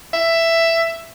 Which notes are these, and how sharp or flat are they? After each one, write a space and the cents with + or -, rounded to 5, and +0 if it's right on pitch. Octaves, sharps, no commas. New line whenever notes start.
E5 +10